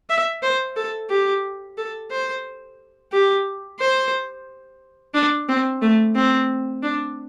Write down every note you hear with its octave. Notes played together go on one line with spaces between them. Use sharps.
E5
C5
A4
G4
A4
C5
G4
C5
D4
C4
A3
C4
D4